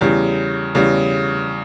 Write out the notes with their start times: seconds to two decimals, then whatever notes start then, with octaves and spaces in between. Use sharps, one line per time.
0.01 E2 C#3 G3
0.75 E2 C#3 G3